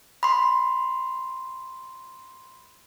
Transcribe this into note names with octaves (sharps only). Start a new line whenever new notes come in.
B5 C6